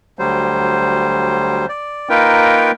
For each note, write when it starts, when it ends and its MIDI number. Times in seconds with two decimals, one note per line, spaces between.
0.19 1.66 38
0.19 1.66 54
0.19 1.66 55
0.19 1.66 72
1.69 2.09 74
2.09 2.71 58
2.09 2.71 63
2.09 2.71 65
2.09 2.71 70
2.09 2.71 71
2.09 2.71 79